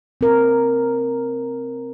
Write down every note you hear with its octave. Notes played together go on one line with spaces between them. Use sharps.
C4 A#4